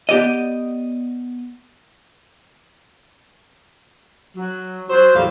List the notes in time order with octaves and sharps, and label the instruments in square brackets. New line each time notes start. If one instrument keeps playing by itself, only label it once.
[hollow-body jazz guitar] B3 G4 D5 D#5
[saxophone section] F#3
F#3 C5
E2 A2 F#3 G3 F5